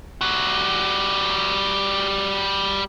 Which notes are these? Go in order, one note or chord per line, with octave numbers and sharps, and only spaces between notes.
G3 F#4